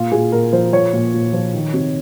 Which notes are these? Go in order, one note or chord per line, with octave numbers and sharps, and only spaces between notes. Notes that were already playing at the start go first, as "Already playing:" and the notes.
Already playing: A#2 F4
A#2 G#4
A#2 A#4
F3 C5
F3 C#5
A#2
A#2
F3
D#3
C3